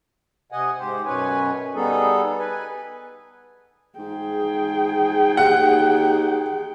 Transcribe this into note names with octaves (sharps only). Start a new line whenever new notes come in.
C3 D#5 F#5 G#5
G#2 G4 C5
F#2 B2 C#4 B4 C#5 G#5
G3 B3 D#4 G#4 A4
B4 G#5
G#2 G#4 G5
D#2 F#5